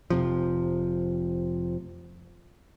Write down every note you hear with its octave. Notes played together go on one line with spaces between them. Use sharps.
F1 C3 F3